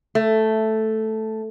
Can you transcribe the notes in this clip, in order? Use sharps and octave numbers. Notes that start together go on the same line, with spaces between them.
A3